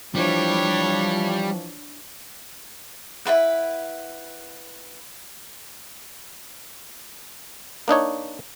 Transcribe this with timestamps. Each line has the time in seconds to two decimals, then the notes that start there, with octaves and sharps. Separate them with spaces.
0.15 E3 F3 G3 D4 C#5
3.25 E4 F4 B4 F#5
7.88 A#3 D4 D#4 C#5